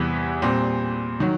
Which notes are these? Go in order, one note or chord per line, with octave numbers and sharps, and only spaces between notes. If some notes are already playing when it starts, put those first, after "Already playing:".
Already playing: E2 C3 E3 G3 B3
A#2 G3 C4
D#3 F#3